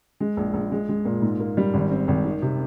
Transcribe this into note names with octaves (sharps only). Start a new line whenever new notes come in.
G#3
A#1
A#1
G#3
G#3
A#2
G#2
A#3
G3
G#1
C4
G#1
D#3
C3